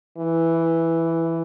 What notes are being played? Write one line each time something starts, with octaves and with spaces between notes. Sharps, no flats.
E3